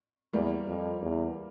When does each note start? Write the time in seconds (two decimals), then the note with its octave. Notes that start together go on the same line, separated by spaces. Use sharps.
0.33 E2 G3 A#3
0.67 F2
1.02 E2